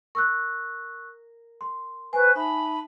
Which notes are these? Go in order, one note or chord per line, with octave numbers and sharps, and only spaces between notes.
A#4 C#6 E6 F#6
C6
B4 C5 G#5 C#6
D#4 E5 A5 B5